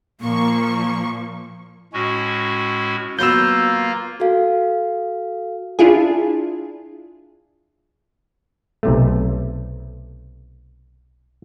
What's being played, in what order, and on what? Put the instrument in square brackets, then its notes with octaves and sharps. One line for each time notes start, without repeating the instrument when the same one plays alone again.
[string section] A#2 F3 C#6 [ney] A#3
[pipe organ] A2 G#3 C#4 F#4
[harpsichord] F#3 B3 [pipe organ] A#3 F4 [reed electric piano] E6 G6
[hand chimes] F#4 A4 F5
[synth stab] D4 E4 F4 G#4
[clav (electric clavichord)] B1 C3 A3